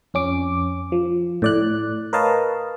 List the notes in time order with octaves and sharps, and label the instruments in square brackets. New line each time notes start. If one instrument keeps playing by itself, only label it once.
[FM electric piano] F2 C#4 D6
F3
A2 D5 F#6
A#4 B4 C#5 D#5 F5 A5